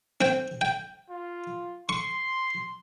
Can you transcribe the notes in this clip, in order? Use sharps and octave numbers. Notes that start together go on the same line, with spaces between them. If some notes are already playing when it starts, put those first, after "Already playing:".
C4 G5
G5
F4
C6 C#6